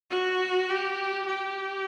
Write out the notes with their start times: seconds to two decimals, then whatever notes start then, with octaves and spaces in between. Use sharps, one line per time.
0.11 F#4
0.69 G4
1.27 G4